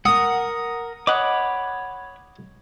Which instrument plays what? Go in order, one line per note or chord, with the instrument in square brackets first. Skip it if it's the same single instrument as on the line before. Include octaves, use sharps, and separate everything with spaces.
[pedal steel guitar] A#4 F#5 [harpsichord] D#6
[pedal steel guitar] C#5 B5 D6 [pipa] D#5 F#5